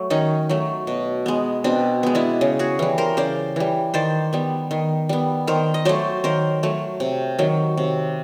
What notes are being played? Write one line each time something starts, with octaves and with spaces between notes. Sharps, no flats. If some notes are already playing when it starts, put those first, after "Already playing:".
Already playing: F#3 A3
D#3 C#4 D#4
F#3 A3
B2
G#3 B3
B2 C4 D4
G#3 B3
D4 E4
C#3
F#4 G#4
E3 G3
A#4 C5
C#3 C5 D5
E3 G3
D#3 C5 D5
G3 B3
D#3
G3 B3
D#3 A#4 C5
D#5
F#3 A3 C5 D5
D#3 A#4 C5
F#3 A3
C3
D#3 F#3
C3